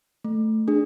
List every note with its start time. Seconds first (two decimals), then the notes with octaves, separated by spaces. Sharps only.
0.24 A3
0.68 D4 G#4